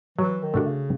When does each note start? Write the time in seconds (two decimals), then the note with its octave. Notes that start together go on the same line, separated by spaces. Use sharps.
0.18 E3 F#3
0.42 D#3
0.54 A3 D4 F#4
0.66 C#3